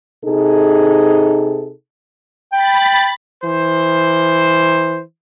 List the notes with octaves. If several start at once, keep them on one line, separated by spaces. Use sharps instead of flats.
C3 D#4 G#4 A4
G5 B5 A6
E3 C5